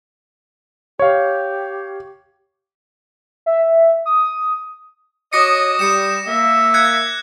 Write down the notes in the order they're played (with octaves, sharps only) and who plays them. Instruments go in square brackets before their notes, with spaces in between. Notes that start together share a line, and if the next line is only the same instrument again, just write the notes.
[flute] G4 [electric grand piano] C#5 F5
[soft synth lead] E5
D#6
[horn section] F#4 C#5 D#5 [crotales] D6 A#6 C#7 [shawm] D#6
[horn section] G3 [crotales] C#7 E7
[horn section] A#3 [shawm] E5
[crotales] F#6 G#6 C#7